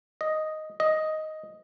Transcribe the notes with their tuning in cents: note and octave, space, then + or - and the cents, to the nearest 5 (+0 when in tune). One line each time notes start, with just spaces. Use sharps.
D#5 +0
D#5 +5